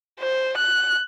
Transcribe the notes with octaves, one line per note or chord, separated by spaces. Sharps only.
C5
F#6